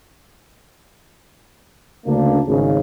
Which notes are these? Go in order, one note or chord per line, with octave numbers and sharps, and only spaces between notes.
D2 C#3 A#3 D4
G#1 C#3